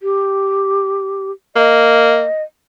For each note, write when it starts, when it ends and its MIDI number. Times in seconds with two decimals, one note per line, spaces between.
0.01 1.31 67
1.56 2.25 58
1.56 2.42 75